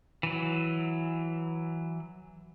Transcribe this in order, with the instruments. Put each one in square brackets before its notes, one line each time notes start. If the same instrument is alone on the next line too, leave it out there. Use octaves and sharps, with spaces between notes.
[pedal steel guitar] E3 F#3